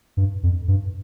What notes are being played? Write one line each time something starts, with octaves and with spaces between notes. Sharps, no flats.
G2
F2
G2